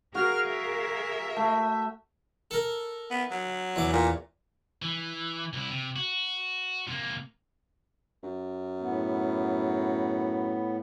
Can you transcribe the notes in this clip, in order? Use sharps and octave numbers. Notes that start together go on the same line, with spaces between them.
F#4 G#4 A#4 F5 F6
E5
A3
A4 A#4
B3
F#3
E2 E3 D6
A#2
E3
C2 E4
C3
F#4
C3 A#3
F#2
A2 B3